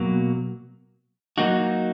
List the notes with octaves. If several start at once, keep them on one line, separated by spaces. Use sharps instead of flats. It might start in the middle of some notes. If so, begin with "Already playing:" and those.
Already playing: B2 F#3 A#3
F#3 A#3 D#4 F#4